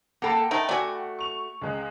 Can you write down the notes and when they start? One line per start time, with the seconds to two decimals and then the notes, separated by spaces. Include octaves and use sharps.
0.22 A#3 A4 F#5 G5 B5
0.51 A3 D#4 A#4
0.69 A3 F#4 D5 G#5
1.19 C#6 F7
1.62 C#2 G#3 F#6